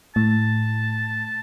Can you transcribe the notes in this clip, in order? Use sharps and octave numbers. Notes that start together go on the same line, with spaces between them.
A2 A5